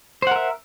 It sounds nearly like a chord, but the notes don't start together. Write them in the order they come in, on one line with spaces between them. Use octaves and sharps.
C5 F#5 A#4 E5